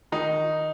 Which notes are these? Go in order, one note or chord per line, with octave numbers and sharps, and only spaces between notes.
D#3 D#4